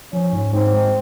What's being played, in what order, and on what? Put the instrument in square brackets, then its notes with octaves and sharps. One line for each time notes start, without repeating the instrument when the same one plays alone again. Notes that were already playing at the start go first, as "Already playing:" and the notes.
[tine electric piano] F3 [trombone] C#4
[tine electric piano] G#2
[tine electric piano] G#2 [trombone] C4
[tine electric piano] G#3